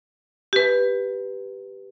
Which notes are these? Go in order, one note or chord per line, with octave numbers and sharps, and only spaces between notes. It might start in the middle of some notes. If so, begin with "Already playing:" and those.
G4 B4